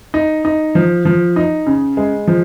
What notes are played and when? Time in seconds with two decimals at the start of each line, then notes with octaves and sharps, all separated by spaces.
0.14 D#4
0.45 D#4
0.75 F3
1.05 F3
1.36 D#4
1.67 C#3
1.97 G#3
2.27 F3